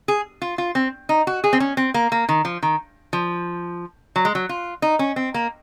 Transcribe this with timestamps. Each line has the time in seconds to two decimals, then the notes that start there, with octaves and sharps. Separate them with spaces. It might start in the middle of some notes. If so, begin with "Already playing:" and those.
0.08 G#4
0.42 F4
0.58 F4
0.75 C4
1.09 D#4
1.27 F#4
1.44 G#4
1.53 C4
1.60 C#4
1.77 C4
1.94 A#3
2.12 A#3
2.29 D#3
2.45 F3
2.63 D#3
3.13 F3
4.16 F#3
4.25 G#3
4.35 F#3
4.49 F4
4.82 D#4
4.99 C#4
5.16 C4
5.34 A#3